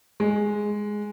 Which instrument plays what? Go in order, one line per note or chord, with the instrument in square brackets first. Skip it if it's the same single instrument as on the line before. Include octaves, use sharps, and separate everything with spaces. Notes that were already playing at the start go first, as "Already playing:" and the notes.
[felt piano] G#3